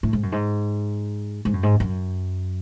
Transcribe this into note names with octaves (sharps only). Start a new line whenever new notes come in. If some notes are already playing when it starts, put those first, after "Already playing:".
A2
G#2
F#2
G#2
G#2
F#2
G#2
F#2